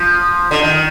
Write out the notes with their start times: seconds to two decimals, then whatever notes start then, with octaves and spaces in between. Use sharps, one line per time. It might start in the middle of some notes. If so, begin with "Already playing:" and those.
Already playing: F3
0.51 D3
0.62 D#3